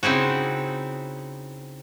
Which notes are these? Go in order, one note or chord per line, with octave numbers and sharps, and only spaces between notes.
C#3 C4 D#4 E4 F#4